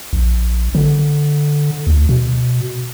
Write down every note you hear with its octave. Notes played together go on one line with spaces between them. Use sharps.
A#1
D3
D2
B2